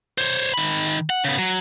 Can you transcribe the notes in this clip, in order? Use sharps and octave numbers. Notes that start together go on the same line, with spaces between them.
C5 C#5
D#3 B5
F#5
C#3 B3
F#3